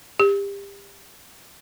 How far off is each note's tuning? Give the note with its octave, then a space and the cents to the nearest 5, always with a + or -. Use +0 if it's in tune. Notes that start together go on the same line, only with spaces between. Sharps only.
G4 +30